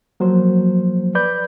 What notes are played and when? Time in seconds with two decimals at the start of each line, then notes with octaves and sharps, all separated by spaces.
0.20 F3 F#3 A#3 C5
1.15 B4 D5 B5 G6